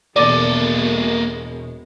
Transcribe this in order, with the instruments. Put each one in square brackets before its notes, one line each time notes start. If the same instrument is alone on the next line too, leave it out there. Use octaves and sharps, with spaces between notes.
[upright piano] E1 D#7 [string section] B2 G#3 [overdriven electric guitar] A#3 A4 [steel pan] D5